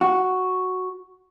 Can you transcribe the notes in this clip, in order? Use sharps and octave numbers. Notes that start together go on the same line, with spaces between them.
F#4